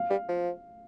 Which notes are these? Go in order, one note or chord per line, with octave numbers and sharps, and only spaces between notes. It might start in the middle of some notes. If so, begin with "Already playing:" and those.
Already playing: F5
G3
F3